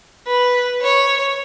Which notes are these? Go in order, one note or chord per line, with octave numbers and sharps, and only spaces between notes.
B4
C#5